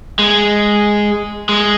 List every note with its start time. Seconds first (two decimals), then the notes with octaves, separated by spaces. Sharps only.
0.19 G#3
1.49 G#3